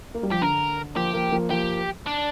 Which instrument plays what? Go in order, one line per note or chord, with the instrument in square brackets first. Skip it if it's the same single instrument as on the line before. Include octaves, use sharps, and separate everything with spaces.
[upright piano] A#3
G3
[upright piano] F3 [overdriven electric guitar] G4
[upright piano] D3 [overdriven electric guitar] A#4
[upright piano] F3 A#3 [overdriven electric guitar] G4
[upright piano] F3 A#3
F3 A#3
[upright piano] F3 A#3 [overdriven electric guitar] G4
[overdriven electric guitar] D4